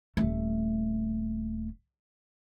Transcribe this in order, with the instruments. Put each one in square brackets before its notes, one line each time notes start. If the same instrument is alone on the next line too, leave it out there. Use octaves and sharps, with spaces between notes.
[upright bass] D#1 A3